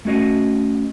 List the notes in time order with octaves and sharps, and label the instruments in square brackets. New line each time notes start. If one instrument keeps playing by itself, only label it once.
[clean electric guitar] A3 C#4 F#4 D#5